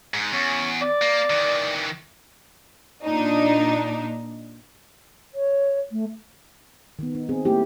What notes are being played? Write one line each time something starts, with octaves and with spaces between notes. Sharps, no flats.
G#2
E2 C#4
D5
A#3
D#3 E3
A#2 D4 D#4
C#5
A3
D#3 B3
D#4
C4 G#4
A3 A#3 E4 G4